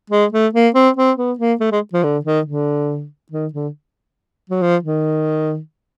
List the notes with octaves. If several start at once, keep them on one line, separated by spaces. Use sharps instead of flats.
G#3
A3
A#3
C4
C4
B3
A#3
A3
G#3
F3
D3
D#3
D3
D#3
D3
F#3
F3
D#3